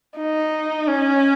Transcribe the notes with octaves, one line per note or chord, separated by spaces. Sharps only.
D#4
C#4